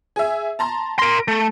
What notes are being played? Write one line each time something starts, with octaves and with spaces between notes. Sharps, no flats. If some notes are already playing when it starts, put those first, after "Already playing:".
G#4 E5
A5 A#5 C6
A#4 C6 A#6 D7
A3